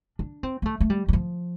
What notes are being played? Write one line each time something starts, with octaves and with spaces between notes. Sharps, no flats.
D4
C4
A#3
A3
A3
G3
G3
F3